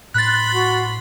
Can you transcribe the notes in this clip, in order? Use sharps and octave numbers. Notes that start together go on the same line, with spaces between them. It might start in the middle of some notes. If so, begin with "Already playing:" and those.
A2 B5 C6 F#6 A6
F#4